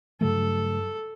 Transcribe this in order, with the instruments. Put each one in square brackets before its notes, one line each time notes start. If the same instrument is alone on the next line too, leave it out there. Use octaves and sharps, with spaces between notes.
[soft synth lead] G2 [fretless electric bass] C#3 F#3 A3 [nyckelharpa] A4